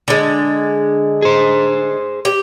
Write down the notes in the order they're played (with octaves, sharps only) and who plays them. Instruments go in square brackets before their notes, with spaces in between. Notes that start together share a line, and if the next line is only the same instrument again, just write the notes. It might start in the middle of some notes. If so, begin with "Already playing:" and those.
[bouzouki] D3 G#3
[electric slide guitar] G#4 C5
[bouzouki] G4